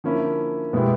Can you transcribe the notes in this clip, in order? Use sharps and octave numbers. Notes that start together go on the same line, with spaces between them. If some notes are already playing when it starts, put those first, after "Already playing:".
D3 F3 A#3 C#4 E4
B2 G#3 B3 E4 G4